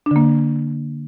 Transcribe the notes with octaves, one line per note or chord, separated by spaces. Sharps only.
D3 A#3 D4